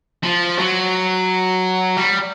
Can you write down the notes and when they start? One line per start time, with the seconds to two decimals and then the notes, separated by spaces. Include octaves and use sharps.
0.23 F3
0.58 F#3
1.97 G3